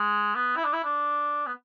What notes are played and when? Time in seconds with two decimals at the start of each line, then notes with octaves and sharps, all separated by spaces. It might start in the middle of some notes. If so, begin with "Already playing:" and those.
Already playing: G#3
0.35 B3
0.57 E4
0.65 D4
0.74 E4
0.84 D4
1.47 B3